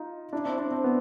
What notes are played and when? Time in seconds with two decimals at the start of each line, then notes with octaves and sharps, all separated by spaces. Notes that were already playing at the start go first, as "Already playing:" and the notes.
Already playing: D#4 F4
0.33 D4 E4
0.45 C4 D4
0.58 C4 D4
0.71 C4
0.84 B3